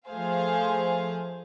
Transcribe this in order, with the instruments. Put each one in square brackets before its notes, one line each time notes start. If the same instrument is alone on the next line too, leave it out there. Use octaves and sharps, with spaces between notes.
[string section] F3 A3 G#4 C5 F5